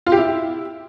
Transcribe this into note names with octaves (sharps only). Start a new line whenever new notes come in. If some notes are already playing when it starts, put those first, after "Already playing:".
F4
G4
E4